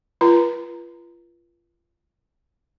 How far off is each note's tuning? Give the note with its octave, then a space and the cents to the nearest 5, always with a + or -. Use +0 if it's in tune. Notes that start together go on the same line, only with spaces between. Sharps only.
F4 -30 B4 -35 A#5 +0